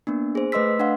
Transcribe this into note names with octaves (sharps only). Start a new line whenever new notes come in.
A#3 B3 D4
G#4 C5
A3 B4 D#5 C6 E6 B6
D4 F5 F#5 C6